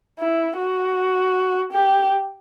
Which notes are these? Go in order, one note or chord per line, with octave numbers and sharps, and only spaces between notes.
E4
F#4
G4